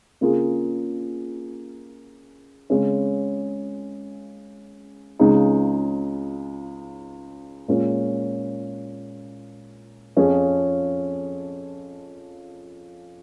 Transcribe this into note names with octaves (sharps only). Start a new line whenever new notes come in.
C#3 A#3 F4 G#4
C#3 G#3 C#4
C#2 C#3 G#3 D#4 G#4
A#2 G#3 C#4
F2 F3 C#4 G#4